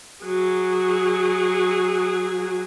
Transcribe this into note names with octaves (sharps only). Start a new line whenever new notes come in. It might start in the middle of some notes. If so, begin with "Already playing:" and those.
F#3 G#4